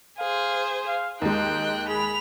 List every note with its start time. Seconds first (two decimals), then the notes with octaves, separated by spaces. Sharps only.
0.19 G#4 C5 F5
0.87 F5
1.22 D#2 G#3 D#4 G5 F#6
1.89 G#4 B5 F7